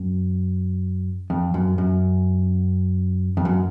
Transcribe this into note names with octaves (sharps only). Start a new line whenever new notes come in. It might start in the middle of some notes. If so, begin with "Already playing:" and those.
Already playing: F#2
F2
F#2
F#2
F2
F#2